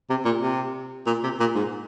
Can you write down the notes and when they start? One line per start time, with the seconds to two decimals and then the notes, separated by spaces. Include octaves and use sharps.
0.10 C3
0.25 A#2
0.41 C3
1.06 A#2
1.23 C3
1.40 A#2
1.55 G#2